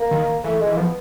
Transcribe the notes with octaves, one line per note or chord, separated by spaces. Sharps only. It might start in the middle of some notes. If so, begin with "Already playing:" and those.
Already playing: A#3
D#3
E3 A3
G#3
E3
F3 B3